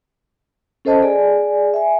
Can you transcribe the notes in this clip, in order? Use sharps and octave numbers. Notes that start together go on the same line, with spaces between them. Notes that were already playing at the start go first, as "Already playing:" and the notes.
C#4 A4 C5 D#5 A5
G#4 D5 G#5
E5 G#5